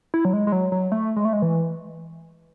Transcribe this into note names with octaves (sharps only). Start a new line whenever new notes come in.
E4
F#3
G#3
G#3
F#3
F#3
A3
G#3
A3
G#3
E3